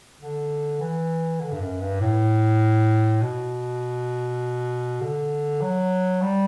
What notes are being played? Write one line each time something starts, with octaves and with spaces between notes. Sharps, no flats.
D3
E3
D3
G2
F#2
G2
A2
B2
D3
F#3
G3